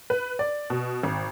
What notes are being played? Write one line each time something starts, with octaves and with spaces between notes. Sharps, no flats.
B4
D5
B2
G#1